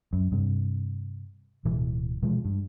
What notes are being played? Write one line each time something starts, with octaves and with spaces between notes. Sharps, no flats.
F#2
G2 C3
D1 B2 E3
B2 E3 F3 G#3
G2